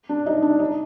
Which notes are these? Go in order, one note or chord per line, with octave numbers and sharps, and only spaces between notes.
D4
D#4
D4
D#4